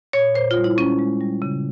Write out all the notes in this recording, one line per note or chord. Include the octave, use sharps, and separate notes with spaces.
A#2 C#5
A#2 C5
F4
G3
E4
G#3 C#4
G#3
G3
C#3